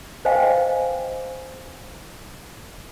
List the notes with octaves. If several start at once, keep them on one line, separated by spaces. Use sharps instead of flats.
B4 C5 D#5 F5 G5 G#5